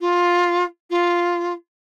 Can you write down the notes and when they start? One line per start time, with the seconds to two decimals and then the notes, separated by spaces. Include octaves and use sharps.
0.01 F4
0.90 F4